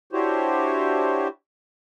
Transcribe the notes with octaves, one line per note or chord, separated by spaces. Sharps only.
D4 E4 F#4 G4 C5 C#5